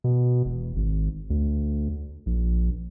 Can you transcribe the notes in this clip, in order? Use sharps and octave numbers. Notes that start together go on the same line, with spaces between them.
B2
E1
G#1
D2
A#1